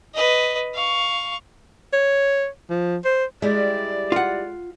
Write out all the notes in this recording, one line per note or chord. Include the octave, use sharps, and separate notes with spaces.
B4 D#5
F5 C#6
C#5
F3
C5
G3 G#3 E4 D5
F4 F#5